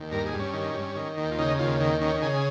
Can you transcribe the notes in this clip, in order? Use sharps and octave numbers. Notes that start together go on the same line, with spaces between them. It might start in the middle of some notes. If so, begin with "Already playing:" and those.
Already playing: D#2
G2 A#4
G#4
G2
C#4
D#3
G2
D#3
D#2
F4
C#3 D#4
D#2 F4
D#3
D#3 C#4
C#3 G#4